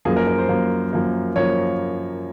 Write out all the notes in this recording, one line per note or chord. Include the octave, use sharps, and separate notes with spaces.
F#2 F3 A#3 G#4
A#4
A#4
C5
F#2 F3 A#3
F#2 F3 A#3
F#2 F3 A#3 C#5